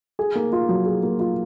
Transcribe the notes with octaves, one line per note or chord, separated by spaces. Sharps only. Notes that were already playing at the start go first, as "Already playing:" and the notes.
G#4
A#3
F4
F#3
G#4
A#3
F4